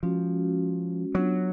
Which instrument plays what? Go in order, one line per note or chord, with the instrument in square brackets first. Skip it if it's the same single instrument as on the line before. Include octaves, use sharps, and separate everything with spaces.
[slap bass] F3 [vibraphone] G#3 C#4 F#4
[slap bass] F#3 [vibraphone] B3 D4 F4